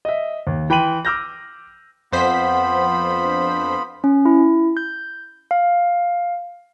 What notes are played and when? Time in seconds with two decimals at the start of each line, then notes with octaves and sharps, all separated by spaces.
0.05 D#5 E5
0.47 D#2
0.70 E3 G5 B5 C6 D#7 F#7
1.05 D6 E6 F6 G6 A#6
2.12 F2 B3 F4 C5 F#5 B5 B6
3.21 D4
4.04 C#4
4.25 E4
4.77 G6
5.51 F5